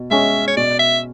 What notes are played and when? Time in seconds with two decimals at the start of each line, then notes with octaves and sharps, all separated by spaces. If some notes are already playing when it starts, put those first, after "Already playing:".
Already playing: B2
0.11 G#3 C#4 G#4 E5
0.48 C#5
0.57 B2 D5
0.79 E5